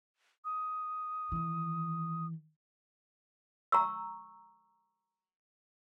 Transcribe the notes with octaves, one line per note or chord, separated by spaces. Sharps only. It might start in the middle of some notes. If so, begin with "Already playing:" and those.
D#6
D#3 E3
A#5 C#6 E6